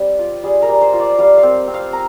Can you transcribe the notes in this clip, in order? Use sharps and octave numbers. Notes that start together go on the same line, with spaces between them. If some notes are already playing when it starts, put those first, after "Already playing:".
Already playing: G3 C4 G4
F4
G3 G#4
A#4
G3
C5
F4
D5
G3 F5
F5
C4
C4
F5
A#5